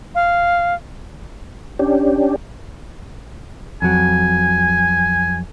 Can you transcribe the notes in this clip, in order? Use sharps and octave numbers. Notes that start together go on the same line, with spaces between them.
F5
C#4 D4 G4
F2 F#3 G#5